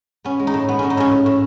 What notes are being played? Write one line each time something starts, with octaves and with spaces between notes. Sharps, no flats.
B3 C#4
G#3
D#4
A2
G#3 B3
A2 C#4
D#4
A2 C#4
A2
A2